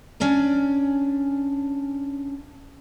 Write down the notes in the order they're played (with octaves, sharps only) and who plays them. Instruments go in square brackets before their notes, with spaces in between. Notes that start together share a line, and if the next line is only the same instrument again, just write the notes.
[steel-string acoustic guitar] C#4 D4 D5 G#5